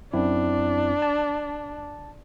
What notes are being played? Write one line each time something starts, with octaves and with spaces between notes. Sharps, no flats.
F#2 C4 D4 E4
A5